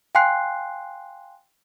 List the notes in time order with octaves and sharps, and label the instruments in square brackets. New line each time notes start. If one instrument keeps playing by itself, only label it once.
[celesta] F5 G5 G#5 C6 F#6 C7